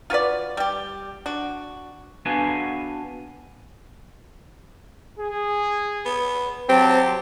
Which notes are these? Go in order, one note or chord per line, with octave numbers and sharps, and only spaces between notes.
F4 F#4 B4 D5
G3 G4
D4 F#4
B3 D4 F#4 B4 F5 G#5
G#4
B3
F#3 C4 G4 A5